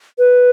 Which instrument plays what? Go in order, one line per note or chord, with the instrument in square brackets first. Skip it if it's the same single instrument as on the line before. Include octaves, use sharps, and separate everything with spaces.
[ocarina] B4